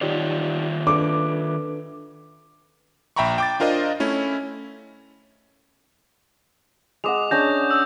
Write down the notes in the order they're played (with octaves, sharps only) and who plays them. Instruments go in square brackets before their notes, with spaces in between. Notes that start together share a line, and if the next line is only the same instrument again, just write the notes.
[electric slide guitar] D#3 F4 C#5 [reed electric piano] D#4 G4 D5
[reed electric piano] D4 A4 B4 [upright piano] D6
[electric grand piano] A#1 E5 G5 A#5 B5 C#6
G5 D6 A6
D4 F4 A#4 C5 D#5
A3 C#4 E4
[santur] G#3 D#5 F#5 [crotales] D6 D#6 F7
[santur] C#4 D4 G#4 [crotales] D6 G6 A#6
[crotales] E6